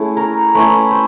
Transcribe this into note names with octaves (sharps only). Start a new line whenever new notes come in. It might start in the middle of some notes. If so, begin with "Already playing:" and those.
Already playing: A3 C#4 E4 G#4
A#4
A3 C#4 E4 B4
C5